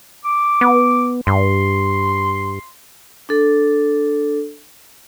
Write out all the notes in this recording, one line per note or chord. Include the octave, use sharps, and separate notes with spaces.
D6
B3
G2 C6
D4 A4